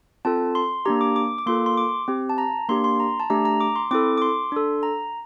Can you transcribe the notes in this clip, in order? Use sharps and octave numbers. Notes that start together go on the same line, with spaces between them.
C4 F4 A4 A5
C6
A#3 D4 G4 A#5
D6
D6
D6
A#3 F4 A4 C6
C6
D6
C4 G4
A5
A#5
A#3 D4 G4 C6
C6
A#5
A5
A3 D4 G4 A#5
A#5
D6
C6
C4 E4 A4 D6
D6
C6
D4 A4
A#5